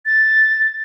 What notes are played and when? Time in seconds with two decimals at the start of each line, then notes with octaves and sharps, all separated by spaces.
0.06 A6